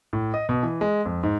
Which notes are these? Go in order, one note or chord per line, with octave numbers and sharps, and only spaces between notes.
A2
D#5
B2
E3
G#3
F2
G#2